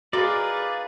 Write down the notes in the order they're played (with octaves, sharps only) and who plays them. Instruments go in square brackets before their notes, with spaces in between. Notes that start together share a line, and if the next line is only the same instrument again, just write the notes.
[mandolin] D#4 F4 A#4 [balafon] F#4 [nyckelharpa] G#4 B4 [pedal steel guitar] D5